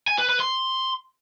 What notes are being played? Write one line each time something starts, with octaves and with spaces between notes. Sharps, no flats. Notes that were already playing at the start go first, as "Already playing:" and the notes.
G#5
B4
B4
C6